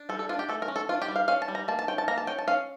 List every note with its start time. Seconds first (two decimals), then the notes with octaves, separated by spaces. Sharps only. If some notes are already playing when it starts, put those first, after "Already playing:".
Already playing: D4
0.09 G3 A4
0.19 A4
0.29 D4 F4
0.39 G4
0.49 A3 A4
0.62 A#4
0.68 C#4
0.76 A4
0.89 D4 F4
1.02 G4
1.08 G3
1.16 F5
1.28 C#4 F5
1.42 A5
1.48 G3
1.55 A#5
1.68 A#3 A5
1.79 A5
1.88 C#4 G5
1.98 A5
2.08 A#3 A#5
2.18 A5
2.27 C#4 G5
2.38 A5
2.48 C#4 F5